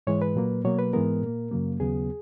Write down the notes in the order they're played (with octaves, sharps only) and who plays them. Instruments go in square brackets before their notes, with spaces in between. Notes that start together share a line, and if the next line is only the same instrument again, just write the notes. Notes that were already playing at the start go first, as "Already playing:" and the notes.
[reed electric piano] G#2 E3 G#3 C#5
B4
A#2 F#3 A#3
B2 F#3 A#3 C#5
B4
G#2 E3 G#3 B3 A#4
A#2 A#3
F#2 C#3 F#3 A#3
D#2 C#3 F#3 B3 G#4